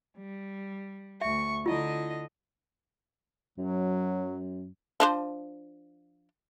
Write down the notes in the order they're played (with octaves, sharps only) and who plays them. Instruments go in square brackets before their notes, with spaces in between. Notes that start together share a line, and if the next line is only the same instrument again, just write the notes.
[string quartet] G3
[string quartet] D2 C#6 [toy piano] E5
[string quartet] D3 D#5 [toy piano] E4 F4
[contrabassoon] F#2 [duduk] F#3
[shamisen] F3 D4 C5